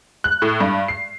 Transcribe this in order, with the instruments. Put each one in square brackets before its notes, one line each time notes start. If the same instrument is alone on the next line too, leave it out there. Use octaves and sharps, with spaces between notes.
[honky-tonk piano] F#6
A2
G2
C7